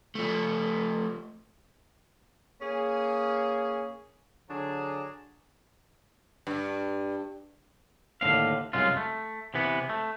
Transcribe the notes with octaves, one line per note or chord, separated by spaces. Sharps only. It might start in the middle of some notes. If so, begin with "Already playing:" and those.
F3 A3
A#3 C#4 G#4
D3 F#3 D4 G#4
G2
D#2 A2 D3 C4 F5
C2 F#2 F#3 G#3 F4
A3
C3 E3 B3
A3